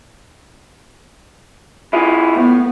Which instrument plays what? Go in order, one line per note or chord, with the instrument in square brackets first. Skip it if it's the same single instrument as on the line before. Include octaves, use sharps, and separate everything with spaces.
[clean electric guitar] E4 F4 G#4
[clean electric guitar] A2 [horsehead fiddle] B3